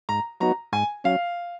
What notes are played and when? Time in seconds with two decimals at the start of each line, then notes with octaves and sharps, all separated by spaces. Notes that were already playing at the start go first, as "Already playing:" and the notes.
0.09 G#2 A#5
0.41 F#3 B3 D#4 F#4 A#5
0.73 G#2 G#5
1.04 F#3 C#4 F5